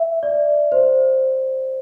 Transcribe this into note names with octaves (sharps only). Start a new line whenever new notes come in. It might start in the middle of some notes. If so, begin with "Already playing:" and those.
Already playing: E5
D5
C5